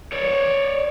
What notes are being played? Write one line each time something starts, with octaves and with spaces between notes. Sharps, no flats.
C#5 D5